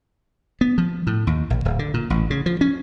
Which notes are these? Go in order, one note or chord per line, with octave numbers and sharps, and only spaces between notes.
B3
F3
A2
D#2
A#1
D1
D3
A#2
A1
C#3
F3
C#4